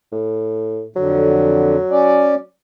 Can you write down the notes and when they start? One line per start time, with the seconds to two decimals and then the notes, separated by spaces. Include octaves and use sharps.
0.12 A2
0.96 F2 D3 F#3
1.91 C#4 D5